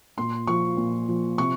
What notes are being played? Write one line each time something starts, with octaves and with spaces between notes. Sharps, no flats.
A#2 C6
F3 C#6
A#2
F3
C3 C#6